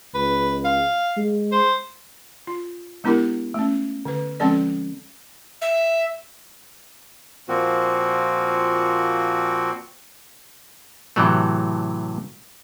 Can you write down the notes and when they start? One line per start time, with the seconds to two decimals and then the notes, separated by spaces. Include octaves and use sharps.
0.14 C#2 B4
0.65 F5
1.17 G#3
1.52 C5
2.47 F4
3.04 G#3 B3 D4 E4 G4 A#4
3.54 A3 C#4
4.05 D3 B4
4.40 F3 G#3 C4 C#4 A4 D5
5.62 E5
7.48 A#2 F3 A#3 C4 F#4
11.16 A2 C3 E3 F#3 A3